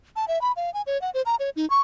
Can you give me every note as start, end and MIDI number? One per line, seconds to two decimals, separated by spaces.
0.16 0.25 81
0.28 0.41 76
0.42 0.52 83
0.56 0.72 77
0.74 0.82 80
0.87 1.00 73
1.02 1.10 78
1.14 1.22 72
1.26 1.36 82
1.40 1.50 73
1.56 1.68 63
1.70 1.81 85